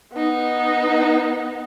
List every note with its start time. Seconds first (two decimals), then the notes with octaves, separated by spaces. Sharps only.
0.14 B3 D#4